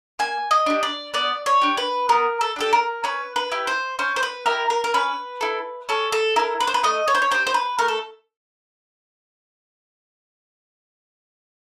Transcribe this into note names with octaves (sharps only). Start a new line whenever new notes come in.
A#3 G#5
D#5
D4 G4
D5
B3 D5
C#5
D4 G4
B4
B3 A#4
A4
D4 G4 A4
A#4
C#4 B4
B4
E4 G4
C5
C#4 C5
C5
B4
E4 G4 A#4
A#4
A#4
C#4 B4
E4 A4
C#4 A4
A4
E4 A4 A#4
B4
C5
B4
A3 D#5
C#5
C5
C#5
D4 G4 C5
C5
B4
A3 A#4
A4